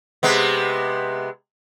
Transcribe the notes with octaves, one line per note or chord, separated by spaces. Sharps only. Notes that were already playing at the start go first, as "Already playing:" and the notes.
C3 G#3 B3